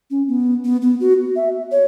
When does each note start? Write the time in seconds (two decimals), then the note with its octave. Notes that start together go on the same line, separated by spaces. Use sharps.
0.11 C#4
0.28 B3
0.65 B3
0.82 B3
1.01 F#4
1.36 E5
1.72 C#5